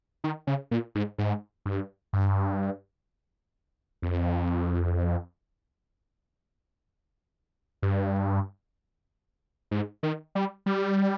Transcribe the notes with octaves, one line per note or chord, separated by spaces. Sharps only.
D#3
C#3
A#2
G#2
G#2
G2
G2
F2
G2
G#2
D#3
G3
G3